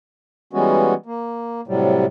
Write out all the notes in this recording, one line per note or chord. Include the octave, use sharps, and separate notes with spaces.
E3 G3 G#3 B3 C#4 F#4
A#3
A2 C3 F#3 G3